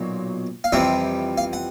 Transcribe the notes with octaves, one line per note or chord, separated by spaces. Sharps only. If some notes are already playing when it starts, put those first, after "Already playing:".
Already playing: B1 A#2 F#3
F5
F2 C3 E3 G3 C4 E5
F5
F#5